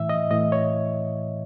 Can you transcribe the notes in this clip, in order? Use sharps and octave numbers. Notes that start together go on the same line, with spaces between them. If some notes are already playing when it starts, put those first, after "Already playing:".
Already playing: A2 E3 E5
D#5
A2 E3 D#5
C#5